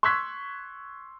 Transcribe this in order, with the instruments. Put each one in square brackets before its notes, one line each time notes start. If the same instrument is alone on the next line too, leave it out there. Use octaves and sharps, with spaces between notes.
[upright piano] C6 C#6 E6 F#6 G#6 B6